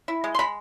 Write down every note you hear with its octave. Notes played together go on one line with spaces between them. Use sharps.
E4
G#3
C6
G#3 B5